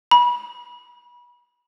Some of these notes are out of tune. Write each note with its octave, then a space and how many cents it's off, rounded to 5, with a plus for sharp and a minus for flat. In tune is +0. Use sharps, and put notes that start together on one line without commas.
B5 -30